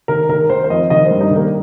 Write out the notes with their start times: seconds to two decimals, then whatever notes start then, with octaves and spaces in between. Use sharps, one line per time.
0.08 D#3 A#4
0.29 D#3 A#4
0.49 D#3 C5
0.64 C5
0.70 F2 D#5
0.90 D#3 D#5
1.06 G2 C5
1.21 D#4
1.31 D#3
1.36 A#3